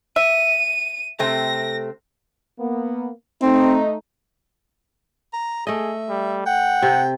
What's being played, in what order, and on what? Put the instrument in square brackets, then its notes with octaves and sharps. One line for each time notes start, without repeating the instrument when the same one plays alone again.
[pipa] E5 [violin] D#7
[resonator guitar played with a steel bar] C3 A3 C4 [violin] A#6
[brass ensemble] A#3 B3
[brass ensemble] A3 D#4 [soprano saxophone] C4
[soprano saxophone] A#5
[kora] A3 D#5 [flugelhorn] G#4 [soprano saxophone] E5
[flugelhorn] G3
[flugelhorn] F#5 [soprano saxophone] G5
[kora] C3